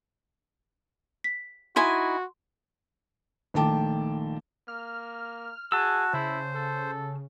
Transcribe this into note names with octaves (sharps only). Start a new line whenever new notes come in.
B6
D#4 E4 F#4 G#5 C6
A#1 D#3 A3 G5 A5 D6
A#3 F6
F#4 G#4 A5 E6
C#3 E4 C5
A4